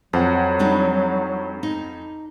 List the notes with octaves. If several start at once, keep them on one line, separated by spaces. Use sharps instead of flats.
F2 F#3 C5 F#5
G3 D4 D#4
D#4